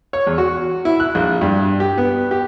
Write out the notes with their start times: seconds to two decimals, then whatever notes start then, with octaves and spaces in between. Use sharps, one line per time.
0.13 C#5
0.27 E2
0.38 F#4
0.85 E4
1.00 F#6
1.15 A#1
1.41 G2
1.80 G4
1.98 B3
2.31 G4